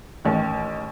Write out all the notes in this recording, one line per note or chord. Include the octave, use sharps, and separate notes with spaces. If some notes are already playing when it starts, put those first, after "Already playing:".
A1 D#3